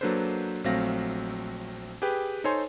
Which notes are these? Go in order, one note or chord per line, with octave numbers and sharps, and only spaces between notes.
F#3 A#3 D4 A4 B4 C5
A#1 F#3 A3 C4 F5 A#6
G4 G#4 B4 G5
D#4 A4 C5 C#5 G#5 C6